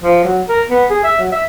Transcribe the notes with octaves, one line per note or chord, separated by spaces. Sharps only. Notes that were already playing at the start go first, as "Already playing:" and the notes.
F3
F#3
A#4
B3
G#4
E5
F#3
E5